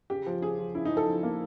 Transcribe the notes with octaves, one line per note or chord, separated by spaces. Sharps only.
C#3 G4
F3
C#3 G#4
F3
C#3 E4
D#4
F3
A4
F3
A#3